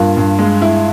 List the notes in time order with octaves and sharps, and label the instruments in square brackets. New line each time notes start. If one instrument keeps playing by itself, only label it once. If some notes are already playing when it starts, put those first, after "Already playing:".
Already playing: [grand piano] G2 A#3 [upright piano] F4
[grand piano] G2
G#3
E4